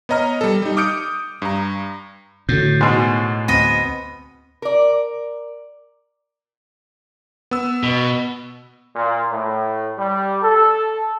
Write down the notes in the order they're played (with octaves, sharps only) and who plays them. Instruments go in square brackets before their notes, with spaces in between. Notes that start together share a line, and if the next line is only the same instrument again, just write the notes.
[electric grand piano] B3 C#5 D#5 A#5 F6
G3 A4
G3 D#4
D6 D#6 F6 G6 C#7 D7
G2 A#5
[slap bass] A2 [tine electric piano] D3 F#4 G6
[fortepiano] G#2 B2 [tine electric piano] F#5
[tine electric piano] D2 C4 [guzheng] B3 D#5
[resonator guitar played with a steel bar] A#4 D5
[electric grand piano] B3 E6
[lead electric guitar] B2
[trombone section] A#2
A2
G3
A4